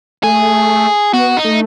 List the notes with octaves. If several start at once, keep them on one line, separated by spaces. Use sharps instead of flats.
A3 G#4
B3 F#4
D#4
A3